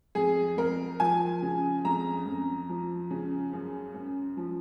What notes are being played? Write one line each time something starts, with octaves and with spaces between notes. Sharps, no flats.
F2 G#4
F2 A#4
F3 G#5
C#3
F2 A#5
F2
F3
C#3
F#2
F#2
F3